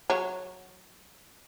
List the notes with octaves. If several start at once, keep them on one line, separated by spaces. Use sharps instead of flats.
F#3 C#5